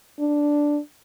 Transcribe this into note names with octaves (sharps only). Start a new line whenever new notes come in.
D4